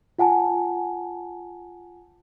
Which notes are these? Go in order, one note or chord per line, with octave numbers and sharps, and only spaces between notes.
F4 F#5 G#5 A5